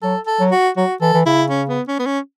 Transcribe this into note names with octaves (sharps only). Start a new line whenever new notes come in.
F#3 A4
A4
F#3
F#4
F#3 F#4
E3 A4
E3
C#3 E4
C#4
B3
C#4
B3
C#4